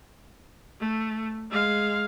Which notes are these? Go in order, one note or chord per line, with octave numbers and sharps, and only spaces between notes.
A3
G#3 F5